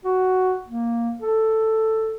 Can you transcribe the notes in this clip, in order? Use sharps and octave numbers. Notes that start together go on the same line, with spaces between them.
F#4
A#3
A4